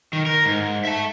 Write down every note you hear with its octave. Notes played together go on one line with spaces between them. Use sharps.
D#3
A#4
G#2
E5 A5